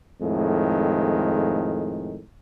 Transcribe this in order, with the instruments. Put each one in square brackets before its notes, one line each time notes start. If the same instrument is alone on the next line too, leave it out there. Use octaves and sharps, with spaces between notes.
[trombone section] F2 A2 D#3 G#3